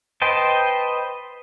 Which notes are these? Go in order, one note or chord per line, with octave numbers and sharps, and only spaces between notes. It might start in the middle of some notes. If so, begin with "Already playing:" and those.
B4 C5 D#5 G5 A5